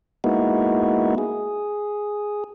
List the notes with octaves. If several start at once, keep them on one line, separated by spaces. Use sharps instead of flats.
G#3 A#3 B3 D#4 E4 F#4
G#4